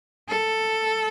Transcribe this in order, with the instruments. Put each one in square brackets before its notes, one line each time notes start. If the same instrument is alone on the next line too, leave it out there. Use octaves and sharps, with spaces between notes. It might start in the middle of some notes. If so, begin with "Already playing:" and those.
[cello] A4